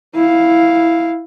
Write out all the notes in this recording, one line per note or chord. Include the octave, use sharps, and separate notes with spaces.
E4 F5